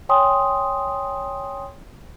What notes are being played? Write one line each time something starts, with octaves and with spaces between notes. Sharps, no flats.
C#5 G5 G#5 C6 D#6